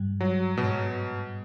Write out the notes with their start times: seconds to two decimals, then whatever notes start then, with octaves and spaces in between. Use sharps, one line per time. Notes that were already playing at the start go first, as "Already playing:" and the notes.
Already playing: G2 G3
0.20 F#3
0.57 G#2 B2 G#3